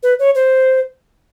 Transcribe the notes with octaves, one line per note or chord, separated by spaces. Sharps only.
B4
C#5
C5